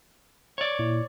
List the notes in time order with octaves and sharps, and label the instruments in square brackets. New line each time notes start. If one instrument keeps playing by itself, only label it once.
[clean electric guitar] C#5 D5
[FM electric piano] A#2 E4